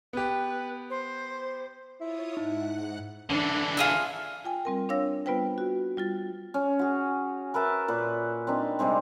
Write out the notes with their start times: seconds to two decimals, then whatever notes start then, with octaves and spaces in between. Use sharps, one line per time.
0.13 B3 G4 B4
0.90 C5
2.01 E4 F4 C#5 D#6
2.37 G#2 D#4 F#5 F#6
3.30 D3 E3 D4
3.77 F4 G#4 E5
4.44 F4 G5 G#5
4.65 G3 C4 A#4
4.89 D4 C#5 F5 E6 A#6
5.26 G3 B3 F4 B4 C5 G5
5.58 F#4
5.97 G3 F4 A6
6.54 C#4
6.79 F#4 G#4
7.54 A#4 B4 E5 A5
7.88 A#2 B4
8.47 C4 D4 D#4 B4
8.79 C3 G3 G#3 C4